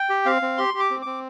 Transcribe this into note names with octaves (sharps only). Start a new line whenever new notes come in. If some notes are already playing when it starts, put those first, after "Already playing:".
Already playing: G5
G4
C4 F5
C4
G4 C6
G4
D6
C4
C4 D6